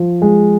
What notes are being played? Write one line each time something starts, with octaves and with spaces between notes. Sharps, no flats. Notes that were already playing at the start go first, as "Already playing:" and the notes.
Already playing: F3
G#3